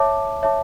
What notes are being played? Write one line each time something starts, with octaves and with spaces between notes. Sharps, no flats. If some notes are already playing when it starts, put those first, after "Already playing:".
Already playing: C#5 E5 A5 D6
C#5 E5 A5 D6